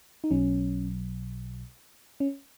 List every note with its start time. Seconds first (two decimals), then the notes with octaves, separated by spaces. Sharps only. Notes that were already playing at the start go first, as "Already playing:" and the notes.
0.24 D#4
0.31 B1 B2 F#3 C#4
2.20 C#4